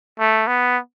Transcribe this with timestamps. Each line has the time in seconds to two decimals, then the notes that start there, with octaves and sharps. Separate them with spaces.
0.19 A3
0.48 B3